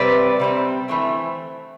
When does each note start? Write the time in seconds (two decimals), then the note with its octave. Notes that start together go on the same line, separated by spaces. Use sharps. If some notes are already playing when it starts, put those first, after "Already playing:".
Already playing: C3 G3 C4 B4 D5
0.39 C3 G3 C4
0.88 E3 A3 C4